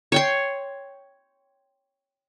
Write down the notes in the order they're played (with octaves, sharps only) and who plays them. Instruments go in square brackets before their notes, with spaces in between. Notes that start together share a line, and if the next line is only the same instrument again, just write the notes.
[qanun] C#5 G5 C6